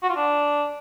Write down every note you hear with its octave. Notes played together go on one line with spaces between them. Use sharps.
F#4
F4
D4